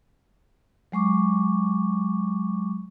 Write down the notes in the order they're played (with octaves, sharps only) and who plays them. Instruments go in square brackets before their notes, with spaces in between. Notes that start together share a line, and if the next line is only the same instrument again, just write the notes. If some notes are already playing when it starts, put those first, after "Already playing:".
[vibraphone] F#3 G#3 C#6 D6